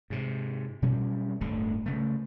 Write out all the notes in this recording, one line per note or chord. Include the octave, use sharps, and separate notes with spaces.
G#2 C3
B2 F#3 G3 C#4
D1 G1 D3 A3
C#3 A3